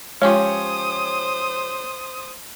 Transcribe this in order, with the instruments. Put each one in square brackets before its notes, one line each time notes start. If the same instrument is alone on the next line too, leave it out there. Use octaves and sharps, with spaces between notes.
[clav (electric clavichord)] F3 C#4 G4 [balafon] G#3 F4 [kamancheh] C5 D#6 [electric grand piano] C#5